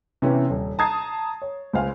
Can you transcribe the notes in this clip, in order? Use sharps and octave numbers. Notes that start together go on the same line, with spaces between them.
C3 E3 B3 C#4 G4 B4
D#1
A5 A#5 D#6 G#6 A6 C7
C#5
C#2 C5 F5 G#5